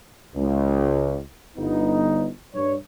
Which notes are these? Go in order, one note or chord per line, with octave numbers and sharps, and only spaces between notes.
C#2
G1 B3 D#4
G2 C#5